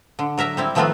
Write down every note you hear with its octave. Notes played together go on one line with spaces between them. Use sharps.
D3
F#3 A#4 E5 A#5
G3 C4 E4
D#3 F3 A3 B3 C4 F4